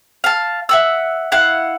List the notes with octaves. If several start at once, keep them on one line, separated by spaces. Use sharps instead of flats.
F5 A5
E5 F#5 E6
E4 F5 F#5